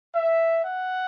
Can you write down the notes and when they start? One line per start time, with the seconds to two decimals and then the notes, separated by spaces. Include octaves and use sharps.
0.15 E5
0.62 F#5